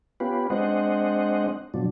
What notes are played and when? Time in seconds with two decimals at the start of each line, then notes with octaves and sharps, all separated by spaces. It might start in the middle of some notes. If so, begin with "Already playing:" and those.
0.20 B3 C#4 F4 G4 B4
0.50 G#3 C4 D4 C5 D#5 F#5
1.74 B2 F3 F#3 D4